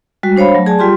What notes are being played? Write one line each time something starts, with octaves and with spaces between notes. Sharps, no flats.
G3 G#3 F#4
D4 C5 C#5 F5 B5
F#3 A3
G#4 D5 G#5 A5
G3 F4 G4 C6